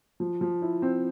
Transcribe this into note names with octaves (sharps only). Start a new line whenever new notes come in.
F3
F3
E4
C4